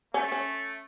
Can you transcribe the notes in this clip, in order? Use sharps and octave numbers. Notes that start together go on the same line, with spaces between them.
A3 C#4
C#4